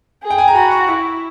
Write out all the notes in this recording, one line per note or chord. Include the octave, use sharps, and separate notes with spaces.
G#4
G5
G#5
A#5
F#4 B5
C#6
E4 C#6